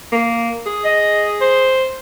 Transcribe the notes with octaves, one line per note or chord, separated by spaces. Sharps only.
A#3
G#4
D#5
C5